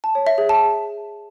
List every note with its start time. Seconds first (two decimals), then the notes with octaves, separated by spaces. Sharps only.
0.04 A5
0.15 C#5
0.27 E5
0.38 G#4
0.49 A5